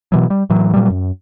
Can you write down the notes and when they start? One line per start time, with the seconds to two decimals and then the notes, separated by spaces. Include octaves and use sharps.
0.12 B2 E3 F#3
0.30 G3
0.50 A2 E3 F#3
0.73 A#2 F#3 G3
0.90 F#2